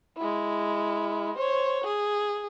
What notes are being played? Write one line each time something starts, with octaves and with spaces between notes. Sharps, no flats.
G#3 E4
C5 C#5
G#4